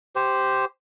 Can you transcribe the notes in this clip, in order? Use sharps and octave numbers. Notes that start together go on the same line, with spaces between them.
G4 C5